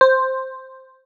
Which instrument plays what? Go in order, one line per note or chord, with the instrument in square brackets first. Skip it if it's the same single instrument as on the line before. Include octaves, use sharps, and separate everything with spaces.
[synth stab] C5